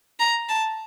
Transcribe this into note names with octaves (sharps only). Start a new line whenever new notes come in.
A#5
A5